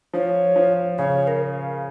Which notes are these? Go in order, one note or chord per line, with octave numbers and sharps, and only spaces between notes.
F3 C#5
F3
C#3 C#5
A#4